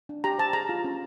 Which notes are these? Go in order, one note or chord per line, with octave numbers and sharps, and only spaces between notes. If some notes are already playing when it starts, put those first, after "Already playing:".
D4
G4 A#5
C5 A5
G#4 A#5
F4
C#4